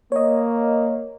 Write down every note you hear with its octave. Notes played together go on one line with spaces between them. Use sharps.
A#3 C#5 D#5